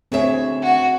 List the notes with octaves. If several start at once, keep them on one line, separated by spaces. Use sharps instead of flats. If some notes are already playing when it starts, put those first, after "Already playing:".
D2 C4 G#4 C#5 E5
F#4